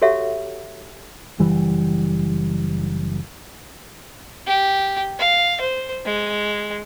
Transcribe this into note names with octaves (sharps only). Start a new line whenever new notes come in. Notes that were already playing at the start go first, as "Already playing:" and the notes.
F#4 G4 A4 C#5 E5 F#5
F#1 E3 G3
G4
F5
C5
G#3